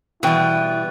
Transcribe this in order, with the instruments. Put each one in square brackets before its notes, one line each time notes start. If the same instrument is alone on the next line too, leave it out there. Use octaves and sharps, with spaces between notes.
[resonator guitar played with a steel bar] B2 G5 [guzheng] E3 G3 [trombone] E4